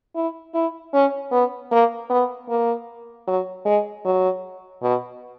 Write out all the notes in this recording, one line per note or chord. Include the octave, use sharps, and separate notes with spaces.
E4
E4
C#4
B3
A#3
B3
A#3
F#3
G#3
F#3
B2